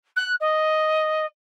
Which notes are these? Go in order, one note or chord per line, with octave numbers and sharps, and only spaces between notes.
F#6
D#5